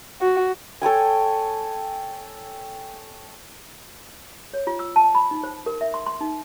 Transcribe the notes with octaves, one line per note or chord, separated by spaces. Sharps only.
F#4
A4 C#5 G5 G#5
C#5
F4
E6
A5
B5
D#4
C5
A#4
E5
C6
C6
D#4